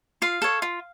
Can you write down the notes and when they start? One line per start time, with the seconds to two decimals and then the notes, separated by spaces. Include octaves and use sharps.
0.22 F4 F5
0.42 A4 C#5
0.62 F4